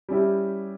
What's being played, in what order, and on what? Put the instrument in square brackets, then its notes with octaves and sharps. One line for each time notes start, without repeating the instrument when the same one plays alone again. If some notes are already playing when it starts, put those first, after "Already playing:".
[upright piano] G3 C#4 E4 G4